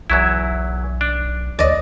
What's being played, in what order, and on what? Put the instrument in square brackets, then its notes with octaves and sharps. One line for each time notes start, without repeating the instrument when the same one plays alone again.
[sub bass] B1 [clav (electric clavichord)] E2 F#3 E4
[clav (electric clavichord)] D4
[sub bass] D2 [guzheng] D5 D#5